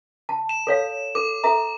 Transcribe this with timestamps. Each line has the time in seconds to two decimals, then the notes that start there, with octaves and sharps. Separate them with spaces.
0.29 A5
0.49 E7
0.67 A4 C#5 F5
1.15 A4 D6
1.44 A4 E5 A#5